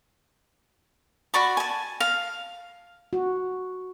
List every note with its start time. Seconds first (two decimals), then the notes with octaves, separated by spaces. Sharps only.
1.34 F#4 D5 B5 C#6
1.57 G#5 A5
2.00 F5
3.13 F#4